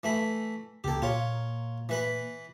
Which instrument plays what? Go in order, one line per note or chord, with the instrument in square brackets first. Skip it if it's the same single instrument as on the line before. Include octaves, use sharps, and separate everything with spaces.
[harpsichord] E3 A3 B5
[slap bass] C#2 C#3 A#3 [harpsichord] G4 A4
[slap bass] A#2 [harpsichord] F4 C#5
[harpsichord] E3 B4 B5